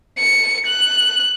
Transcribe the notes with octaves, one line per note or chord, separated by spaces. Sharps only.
C#7
F#6